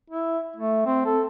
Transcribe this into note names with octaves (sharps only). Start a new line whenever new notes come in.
E4
A3
C4
A4